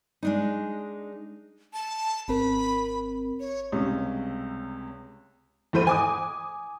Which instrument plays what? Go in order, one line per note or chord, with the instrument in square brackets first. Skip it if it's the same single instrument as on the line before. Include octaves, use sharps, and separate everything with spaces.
[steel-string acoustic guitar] G#3 D4 D#4
[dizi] A5
[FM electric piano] G#1 C4 A#4 [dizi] B5
[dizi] C#5
[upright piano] C#2 C3 G3 C#4
[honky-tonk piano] E2 A3 C5 B5 D#7
G#5 D6 D#6